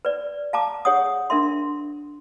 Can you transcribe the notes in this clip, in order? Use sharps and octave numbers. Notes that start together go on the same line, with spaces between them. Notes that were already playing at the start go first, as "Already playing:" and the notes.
B4 D5
F5 A5 A#5 D6
G#4 C#5 F#5 D#6
D4 A#4 E5 C6